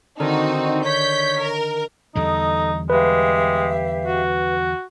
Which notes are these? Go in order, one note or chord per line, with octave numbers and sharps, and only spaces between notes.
D3 D#3 C4 D#4 F#4
C#5 G6 B6
A#4
E2 D3 G3 D#4 A4 D#5 D#6
G#3 G4 B4 E5 F5
F#4